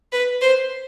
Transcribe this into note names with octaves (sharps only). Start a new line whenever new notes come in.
B4
C5